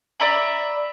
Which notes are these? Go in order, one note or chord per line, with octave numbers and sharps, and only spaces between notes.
D5 E5 A#5 B5